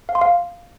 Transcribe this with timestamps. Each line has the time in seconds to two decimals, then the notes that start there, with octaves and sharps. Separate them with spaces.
0.09 F5
0.15 C6
0.21 F5